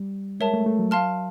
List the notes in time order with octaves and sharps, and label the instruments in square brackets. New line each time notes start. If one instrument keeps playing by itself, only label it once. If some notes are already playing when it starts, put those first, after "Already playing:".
Already playing: [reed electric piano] G3
[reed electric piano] G#3 [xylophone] A#4 C#5 E5 A5
[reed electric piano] A3
A3
F#3
[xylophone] F5 A5 C6 F6